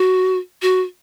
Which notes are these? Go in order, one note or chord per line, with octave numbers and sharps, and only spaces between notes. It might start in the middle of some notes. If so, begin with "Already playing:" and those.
Already playing: F#4
F#4